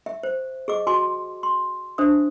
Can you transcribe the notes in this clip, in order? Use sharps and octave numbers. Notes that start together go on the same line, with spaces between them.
E5
C5
G#4 D#5 D6
F#4 G#5 C6 D6
C6
D4 C5 E5 D#6